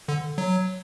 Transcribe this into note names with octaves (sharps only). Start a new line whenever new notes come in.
D3
F#3